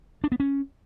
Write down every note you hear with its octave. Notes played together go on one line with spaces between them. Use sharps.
D4
B3
C#4